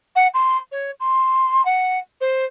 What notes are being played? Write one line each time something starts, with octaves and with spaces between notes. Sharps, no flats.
F#5
C6
C#5
C6
F#5
C5